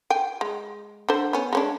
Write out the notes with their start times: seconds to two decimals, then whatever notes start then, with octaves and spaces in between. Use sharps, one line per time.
0.10 G5 G#5
0.41 G#3
1.09 D3 C5
1.33 B3 C#4
1.53 G#3 C#4 D4